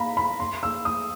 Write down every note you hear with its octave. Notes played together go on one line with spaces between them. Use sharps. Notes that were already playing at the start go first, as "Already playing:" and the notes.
Already playing: F5 A#5 B5
B5
C6
E6
D#6